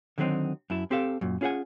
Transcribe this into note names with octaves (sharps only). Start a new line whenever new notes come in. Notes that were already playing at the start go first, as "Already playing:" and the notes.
D3 D#3 F#3 G3 C4 D#4
F#2 E4 A5
C4 G4 A4 F5
F#2 A#2
C#4 F4 G#4 B4 F#5 G#5